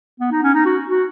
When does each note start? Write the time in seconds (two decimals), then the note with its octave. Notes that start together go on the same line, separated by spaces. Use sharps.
0.20 B3
0.32 D#4
0.43 C#4
0.54 D#4
0.65 F#4
0.88 F#4